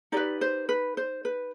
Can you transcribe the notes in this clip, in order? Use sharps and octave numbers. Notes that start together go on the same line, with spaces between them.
D#4 G4 B4 D5
C5
B4
C5
B4